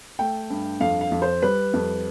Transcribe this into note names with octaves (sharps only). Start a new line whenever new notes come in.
A3 G5
G2
F2 F5
F5
F2
C5
G3 B4
F2